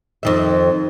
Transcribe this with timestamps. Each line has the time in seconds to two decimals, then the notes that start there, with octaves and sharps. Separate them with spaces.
0.23 F2 D#3 E5